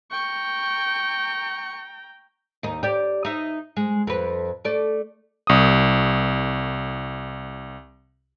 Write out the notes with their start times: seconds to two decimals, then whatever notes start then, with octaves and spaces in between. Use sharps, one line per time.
0.11 G5 A#5 C#6
2.63 D#2 D#4
2.83 G4 D5
3.25 D#4 E5
3.77 G#3
4.07 F2 B4
4.65 A3 D5
5.47 C2 D#6